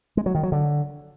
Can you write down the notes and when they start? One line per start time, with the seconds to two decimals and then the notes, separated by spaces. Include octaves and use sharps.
0.17 G#3
0.26 F#3
0.35 D#3
0.43 F#3
0.52 D3